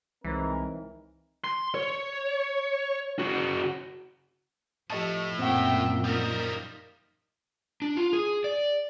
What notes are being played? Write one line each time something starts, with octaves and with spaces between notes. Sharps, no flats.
C2 E3 G#3 C4 D#4 A#4 C#5
C6
C#5
C#3 F#4
A2 F3 G4 D#5 A5
F#2 A#2 C4 E5 F#5 G5
F3 G3 D#4 A#4
D4
F4
G#4
D5